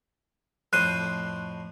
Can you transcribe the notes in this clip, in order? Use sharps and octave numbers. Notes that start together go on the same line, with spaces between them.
F2 A2 C5 F#6 D#7